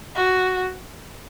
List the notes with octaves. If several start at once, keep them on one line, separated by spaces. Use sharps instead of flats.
F#4